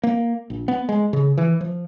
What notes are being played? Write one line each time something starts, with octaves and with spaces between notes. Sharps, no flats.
A#3
A#1
B3
G#3
C#3
E3
F3